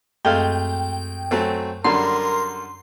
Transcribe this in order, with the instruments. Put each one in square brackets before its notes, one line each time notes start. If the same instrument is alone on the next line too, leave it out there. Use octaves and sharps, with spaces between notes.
[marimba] F#2 C4 [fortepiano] G#3 A3 F5 [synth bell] G5
[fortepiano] F#3 A3 C4 [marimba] G#5
[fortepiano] F#2 D3 G3 [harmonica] A#4 [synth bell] C6